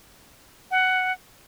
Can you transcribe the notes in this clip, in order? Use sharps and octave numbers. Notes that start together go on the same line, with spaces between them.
F#5